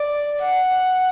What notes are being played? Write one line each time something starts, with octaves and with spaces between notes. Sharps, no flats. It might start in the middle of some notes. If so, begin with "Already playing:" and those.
Already playing: D5
F#5